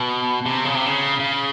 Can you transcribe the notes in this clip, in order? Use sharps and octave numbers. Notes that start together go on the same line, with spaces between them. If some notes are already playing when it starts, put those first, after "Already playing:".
Already playing: B2
C3
C#3
C3
C#3
C#3